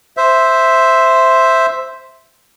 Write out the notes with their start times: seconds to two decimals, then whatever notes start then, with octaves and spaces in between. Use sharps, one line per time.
0.17 C5 E5